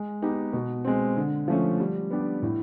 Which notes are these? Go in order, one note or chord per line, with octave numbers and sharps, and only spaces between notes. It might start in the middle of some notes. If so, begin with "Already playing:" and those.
Already playing: G#3
B3 D#4 G4
B2
G#3 C4
D3
F3 A3 C#4
G3
B3 D4 G4
A2